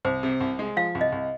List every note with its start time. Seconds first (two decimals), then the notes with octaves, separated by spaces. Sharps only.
0.05 C2 C5
0.23 C3
0.41 C2
0.59 G#3
0.77 F3 F5
0.95 C2
1.01 D#5
1.12 C2